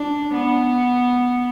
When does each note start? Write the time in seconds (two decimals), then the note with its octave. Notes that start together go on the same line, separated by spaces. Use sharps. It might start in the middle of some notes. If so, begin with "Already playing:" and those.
Already playing: D4
0.35 B3